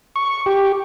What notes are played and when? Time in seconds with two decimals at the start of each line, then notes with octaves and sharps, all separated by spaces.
0.16 C#6
0.46 G4